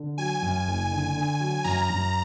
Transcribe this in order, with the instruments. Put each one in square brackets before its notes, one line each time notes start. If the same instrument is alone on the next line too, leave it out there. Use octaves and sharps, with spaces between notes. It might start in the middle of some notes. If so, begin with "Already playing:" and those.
Already playing: [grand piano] D3
[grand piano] F#3 [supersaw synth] G#5
[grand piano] F#2
F#1
D3
D3
F#3
[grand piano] F#2 [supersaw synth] A#5
[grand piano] F#2